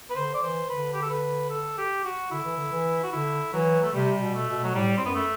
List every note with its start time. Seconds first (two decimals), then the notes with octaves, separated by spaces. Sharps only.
0.10 B4
0.15 D3 C5
0.34 D5
0.42 E3 C5
0.69 D3 B4
0.93 G4
1.02 A4
1.10 B4
1.50 A4
1.78 G4
2.04 F#4
2.31 D3 E4
2.44 E3
2.56 D3
2.72 E3
3.03 F#4
3.13 D3 E4
3.52 E3 F#3
3.83 A3
3.93 C3 G3
4.20 B2
4.34 A3
4.48 B2
4.64 F#3
4.75 A2 G3
4.97 C4
5.02 F#2 B3
5.15 A3